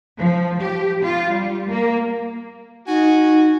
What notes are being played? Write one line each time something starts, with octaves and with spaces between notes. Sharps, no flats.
F3
G4
F4
G3
A#3
D#4 F#4 G#5